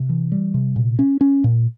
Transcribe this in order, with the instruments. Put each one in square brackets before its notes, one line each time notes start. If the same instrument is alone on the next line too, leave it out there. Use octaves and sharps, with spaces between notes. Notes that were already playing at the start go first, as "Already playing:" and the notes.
Already playing: [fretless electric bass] C3
E3
G3
C3
A#2
C#4
C#4
A#2